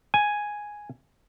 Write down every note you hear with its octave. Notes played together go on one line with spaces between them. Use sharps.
G#5